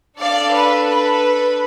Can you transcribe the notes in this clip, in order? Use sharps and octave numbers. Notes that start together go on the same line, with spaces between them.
D4 A4 D5 F5
B4
B4